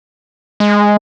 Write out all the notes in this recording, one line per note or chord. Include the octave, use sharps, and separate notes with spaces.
G#3